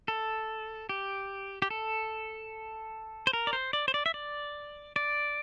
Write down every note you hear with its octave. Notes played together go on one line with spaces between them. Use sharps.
A4
G4
G4
A4
C5
A#4
D5
C5
D5
C5
D5
E5
D5
D5